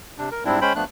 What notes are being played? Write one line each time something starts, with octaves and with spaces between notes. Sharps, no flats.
C3 D4
A#4
G#2 G3 C4 D4 E4
G#3 C#4 C5 G5 B5
F3 A3 B3 D4 F#6